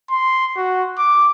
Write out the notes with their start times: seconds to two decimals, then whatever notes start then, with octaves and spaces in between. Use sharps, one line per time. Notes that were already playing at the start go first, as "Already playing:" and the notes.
0.11 C6
0.57 F#4
0.98 D6